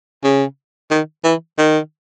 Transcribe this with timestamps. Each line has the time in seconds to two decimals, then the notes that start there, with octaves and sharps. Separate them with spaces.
0.24 C#3
0.90 D#3
1.24 E3
1.58 D#3